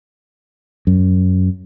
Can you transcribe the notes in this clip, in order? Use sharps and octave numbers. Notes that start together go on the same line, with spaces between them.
F#2